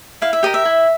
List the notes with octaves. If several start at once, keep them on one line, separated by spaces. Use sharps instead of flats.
E4 F5
E5
G4 A#4 D#5
E5
E4